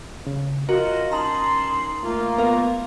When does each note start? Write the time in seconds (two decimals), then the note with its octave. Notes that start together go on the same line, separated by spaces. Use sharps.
0.27 C#3
0.69 F4 F#4 A#4 D#5
1.12 C#4 D#4 A5 A#5 C6 D#6 F#7
2.04 A3 A#3 F4
2.38 B3 A#4 F5